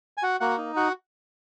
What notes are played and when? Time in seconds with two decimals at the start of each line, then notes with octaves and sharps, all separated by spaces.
0.17 G#5
0.23 F#4 F#5
0.40 A#3 F#4 F#5
0.58 D#4
0.76 F#4 F#5